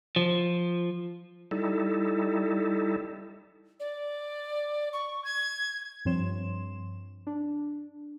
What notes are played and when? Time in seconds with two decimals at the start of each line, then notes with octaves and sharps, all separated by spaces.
0.16 F3
1.51 G3 D#4 E4 A4
3.80 D5
4.93 C#6
5.24 G#6
6.05 G2 F3 C4 C#5 C6 E7
7.27 D4